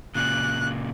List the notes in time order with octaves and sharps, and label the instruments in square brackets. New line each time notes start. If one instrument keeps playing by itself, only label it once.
[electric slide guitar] A#2 C#3 [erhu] F#6